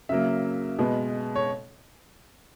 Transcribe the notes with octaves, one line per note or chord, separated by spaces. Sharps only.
C#3 F#3 A#3 E5
B2 G#3 B3
C#5